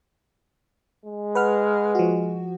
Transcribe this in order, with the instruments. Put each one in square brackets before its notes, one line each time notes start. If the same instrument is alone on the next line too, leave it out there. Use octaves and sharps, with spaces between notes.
[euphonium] G#3
[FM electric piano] B4 F#5 F6
F3 F#4